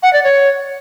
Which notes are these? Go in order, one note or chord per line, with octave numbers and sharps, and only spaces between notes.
F#5
D5
C#5